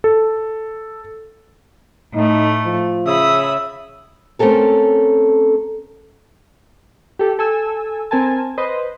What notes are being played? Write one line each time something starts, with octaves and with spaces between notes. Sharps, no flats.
A4
A2 A3 D#4
F3
C#3 E5 B5 D#6
A3 C4 C#4 A4 A#4
G4 A4
A4 G#5 E6
C4 A#4 G#5 A5
B4 C5 D#5